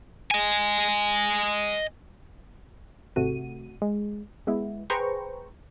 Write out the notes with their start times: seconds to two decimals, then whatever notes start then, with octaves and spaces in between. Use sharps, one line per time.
0.31 D#5 G#5
3.16 G#1 C3 A3 F#4 D#7
3.82 G#3
4.47 G#3 B3 E4
4.90 G#4 B4 C5 G5 A#5 C#6